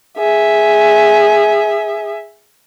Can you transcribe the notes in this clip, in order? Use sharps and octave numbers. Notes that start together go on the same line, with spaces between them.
G#4 E5